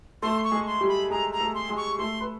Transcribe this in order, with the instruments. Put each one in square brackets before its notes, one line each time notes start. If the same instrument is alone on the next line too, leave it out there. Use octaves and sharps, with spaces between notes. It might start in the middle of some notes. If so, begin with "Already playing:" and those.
[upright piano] A3 A4 [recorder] C6
[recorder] C#6
[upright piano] G#3 G#4
[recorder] C6
[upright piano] G3 G4
[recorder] B5
[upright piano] G#3 G#4 [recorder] A#5
[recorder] A#5
[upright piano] A3 A4
[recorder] C6
[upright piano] G#3 G#4
[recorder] C#6
[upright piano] A3 A4 [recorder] C6
[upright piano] B4